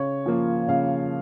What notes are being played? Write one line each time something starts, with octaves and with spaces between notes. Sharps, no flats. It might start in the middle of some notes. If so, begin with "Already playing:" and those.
Already playing: C#3 C#5
F3 A#3 F4
C#3 F5